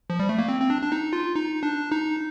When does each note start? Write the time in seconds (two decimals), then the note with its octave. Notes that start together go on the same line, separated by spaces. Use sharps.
0.10 F3
0.19 G3
0.29 A3
0.39 A#3
0.48 C4
0.61 C4
0.70 D4
0.82 D4
0.92 D#4
1.13 F4
1.35 D#4
1.63 D4
1.92 D#4